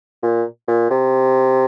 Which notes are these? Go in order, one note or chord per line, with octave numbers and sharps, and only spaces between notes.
A#2
A#2
C3